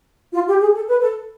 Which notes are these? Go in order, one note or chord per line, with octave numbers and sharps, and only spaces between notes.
F4
G4
G#4
A4
B4
A4